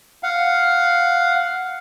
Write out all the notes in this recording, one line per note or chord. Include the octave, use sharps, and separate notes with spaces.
F5 F#5